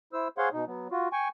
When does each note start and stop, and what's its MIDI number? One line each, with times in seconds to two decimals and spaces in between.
0.13 0.28 64
0.13 0.28 72
0.13 0.28 88
0.38 0.49 68
0.38 0.49 72
0.38 0.49 73
0.38 0.49 77
0.38 0.49 78
0.38 0.49 84
0.53 0.65 47
0.53 0.65 63
0.67 0.88 54
0.67 0.88 59
0.91 1.08 65
0.91 1.08 66
1.13 1.28 79
1.13 1.28 80
1.13 1.28 85